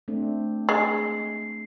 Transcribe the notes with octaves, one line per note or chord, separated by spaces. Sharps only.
A3 C4 D4
G#3 C7